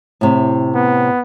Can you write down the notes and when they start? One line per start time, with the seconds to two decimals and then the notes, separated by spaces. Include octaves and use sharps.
0.21 A2 C3
0.74 B3